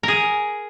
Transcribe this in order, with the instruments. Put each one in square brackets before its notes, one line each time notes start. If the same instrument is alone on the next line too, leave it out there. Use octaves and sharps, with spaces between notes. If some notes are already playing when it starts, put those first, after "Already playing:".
[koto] G#4 A#4